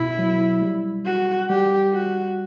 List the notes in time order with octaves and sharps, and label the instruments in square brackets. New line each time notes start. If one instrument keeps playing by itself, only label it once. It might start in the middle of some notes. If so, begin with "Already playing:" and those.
Already playing: [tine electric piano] B2 [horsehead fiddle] E4
[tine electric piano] F#3
G3
[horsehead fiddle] F#4
[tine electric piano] G3 [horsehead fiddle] G4
[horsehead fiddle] F#4